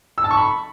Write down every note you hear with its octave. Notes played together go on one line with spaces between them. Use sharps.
E6
A5
C#6
B5